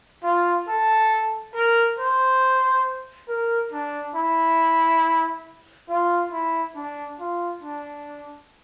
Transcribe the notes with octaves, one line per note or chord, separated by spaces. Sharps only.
F4
A4
A#4
C5
A#4
D4
E4
F4
E4
D4
F4
D4